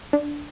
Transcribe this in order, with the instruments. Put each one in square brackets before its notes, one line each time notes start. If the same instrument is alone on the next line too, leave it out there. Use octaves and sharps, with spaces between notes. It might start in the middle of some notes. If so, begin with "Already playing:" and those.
[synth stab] D4